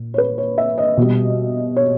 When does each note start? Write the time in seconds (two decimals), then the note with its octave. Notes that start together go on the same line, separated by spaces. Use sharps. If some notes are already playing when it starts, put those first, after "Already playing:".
Already playing: A#2
0.14 C#5
0.18 B4
0.38 C#5
0.58 E5
0.78 D#5
0.97 B2 G3
1.76 C#5